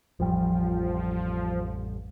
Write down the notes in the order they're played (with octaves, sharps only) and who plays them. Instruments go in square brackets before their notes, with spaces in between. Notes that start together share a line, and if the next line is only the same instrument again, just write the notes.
[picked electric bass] A1 F2 G3 [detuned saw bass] F3